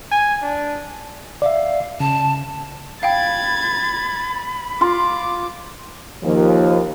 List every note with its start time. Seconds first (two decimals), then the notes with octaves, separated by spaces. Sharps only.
0.12 G#5
0.42 D4
1.42 D5 E5 F5
2.00 C#3 A5
3.03 F5 G5 B5 G#6 A6
4.81 F4 C6 D6
6.24 D#2 F3